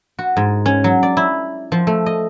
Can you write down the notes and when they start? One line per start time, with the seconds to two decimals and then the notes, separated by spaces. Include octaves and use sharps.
0.19 F#4
0.37 G#2
0.66 C#4
0.84 F#3
1.03 D5
1.17 E4
1.72 F3
1.87 A3
2.06 D#5